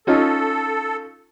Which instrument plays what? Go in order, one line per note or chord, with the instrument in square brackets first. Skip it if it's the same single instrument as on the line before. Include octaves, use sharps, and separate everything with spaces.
[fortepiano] C#4 D#4 F4 [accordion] A4